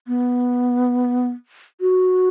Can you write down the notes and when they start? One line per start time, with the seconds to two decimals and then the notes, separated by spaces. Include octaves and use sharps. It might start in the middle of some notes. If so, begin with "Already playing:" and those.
0.07 B3
1.81 F#4